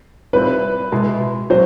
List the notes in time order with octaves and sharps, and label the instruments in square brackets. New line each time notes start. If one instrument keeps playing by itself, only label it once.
[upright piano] A#2 G3 C4 E4 [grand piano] B4
[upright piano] B2 G#3 B3 E4
[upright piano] A#2 F#3 [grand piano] C5